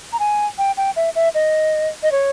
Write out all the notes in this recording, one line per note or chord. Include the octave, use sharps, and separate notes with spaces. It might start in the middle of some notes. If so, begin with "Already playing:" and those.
A#5
G#5
G5
G5
E5
E5
D#5
D#5
C#5